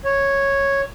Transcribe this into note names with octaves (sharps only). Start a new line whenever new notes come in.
C#5